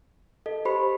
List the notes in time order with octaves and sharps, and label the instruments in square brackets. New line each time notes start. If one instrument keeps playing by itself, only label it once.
[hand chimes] A4 [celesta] D#5
[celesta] G4 [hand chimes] C5 B5